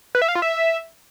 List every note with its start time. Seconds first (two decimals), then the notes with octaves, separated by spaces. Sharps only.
0.15 B4
0.22 E5
0.28 F5
0.35 F4
0.42 E5